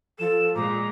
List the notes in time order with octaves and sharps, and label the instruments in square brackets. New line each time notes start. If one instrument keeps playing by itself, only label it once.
[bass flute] F3 [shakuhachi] A4 [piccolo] E7
[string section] A#2 G#3 [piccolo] A#5 [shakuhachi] D6